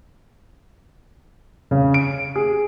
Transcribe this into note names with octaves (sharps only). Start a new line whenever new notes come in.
C#3
D7
G#4